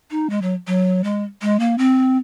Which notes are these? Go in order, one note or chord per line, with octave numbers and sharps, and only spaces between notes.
D#4
G#3
F#3
F#3
G#3
G#3
A#3
C4